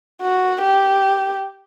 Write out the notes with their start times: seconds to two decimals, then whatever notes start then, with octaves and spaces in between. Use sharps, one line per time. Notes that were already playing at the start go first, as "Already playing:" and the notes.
0.22 F#4
0.62 G4